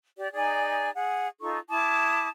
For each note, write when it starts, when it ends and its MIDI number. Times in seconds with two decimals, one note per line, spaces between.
0.18 0.31 67
0.18 0.31 74
0.33 0.89 63
0.33 0.89 68
0.33 0.89 74
0.33 0.89 80
0.94 1.27 68
0.94 1.27 78
1.40 1.58 63
1.40 1.58 65
1.40 1.58 69
1.40 1.58 85
1.69 2.28 64
1.69 2.28 81
1.69 2.28 86
1.69 2.28 87